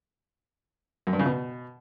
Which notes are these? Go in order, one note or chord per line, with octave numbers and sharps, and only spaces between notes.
F#2
G2
C#3
B2